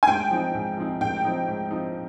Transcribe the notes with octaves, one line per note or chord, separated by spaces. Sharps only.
G#5
G#2 G5
F3 C4 D#4
G#2
F3 C4 D#4
G#2 G5
F3 C4 D#4
G#2
F3 C4 D#4